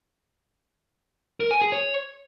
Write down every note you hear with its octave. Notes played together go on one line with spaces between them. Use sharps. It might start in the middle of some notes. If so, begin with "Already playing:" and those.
A#4
G#5
G#4
C#5